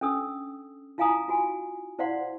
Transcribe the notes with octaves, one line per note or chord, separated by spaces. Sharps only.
C#4 D4 A4 D#6 E6
E4 F4 F5 G#5 A#5 D#6
F4 F#4 G#5
E4 C5 D5 F5 F#5 C6